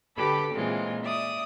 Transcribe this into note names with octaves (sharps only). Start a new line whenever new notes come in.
D3 G4 A4 B4 B5 D6
A#2 E3 G#3 C4 C#4 F4
D5 E5 D#6